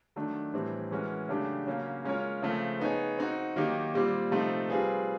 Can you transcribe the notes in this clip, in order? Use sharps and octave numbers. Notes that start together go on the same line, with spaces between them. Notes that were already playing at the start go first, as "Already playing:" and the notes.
D#3 F#3 A3 D4
A2 E3 G3 C4
E3 G#3 C#4 F#4 A#4
C#3 F#3 A3 D4 G4
C#3 F#3 A#3 C#4
G#3 C#4 F4 A#4 C#5
C#3 F3 A3 C4
B3 D#4 G#4 C#5
C4 D#4 F#4
D#3 F#3 A#3 D#4 G4
A#2 G3 C4
C3 F3 A3 C4 D#4
G3 C4 F4 G#4 B4